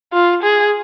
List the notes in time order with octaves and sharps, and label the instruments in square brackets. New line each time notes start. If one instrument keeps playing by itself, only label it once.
[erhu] F4
G#4